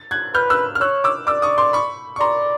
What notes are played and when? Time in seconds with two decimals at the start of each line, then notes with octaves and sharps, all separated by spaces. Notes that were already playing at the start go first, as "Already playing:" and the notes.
Already playing: A6
0.11 F#6 G#6
0.34 B4 F6 G6
0.50 E6 F#6
0.75 F6
0.81 C#5 E6 F#6
1.04 D6 E6
1.27 D5 D6 E6
1.42 C#6 D#6
1.58 C6 D6
1.73 B5 C#6
2.16 C#6
2.20 D5 A#5 C6